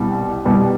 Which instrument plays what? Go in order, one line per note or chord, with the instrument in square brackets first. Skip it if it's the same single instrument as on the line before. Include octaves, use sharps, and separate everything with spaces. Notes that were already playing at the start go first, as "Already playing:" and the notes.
Already playing: [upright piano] C2 B2 G3
C2 B2 G3